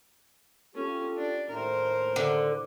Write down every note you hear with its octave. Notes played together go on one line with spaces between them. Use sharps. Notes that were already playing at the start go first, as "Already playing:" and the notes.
C#4 F4 G4 A4
D4
D#2 A2 A#4 C5
D3